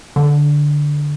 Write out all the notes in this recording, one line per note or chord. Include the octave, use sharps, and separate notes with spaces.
D3